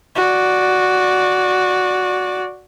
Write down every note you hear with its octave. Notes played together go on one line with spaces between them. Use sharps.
F#4 D5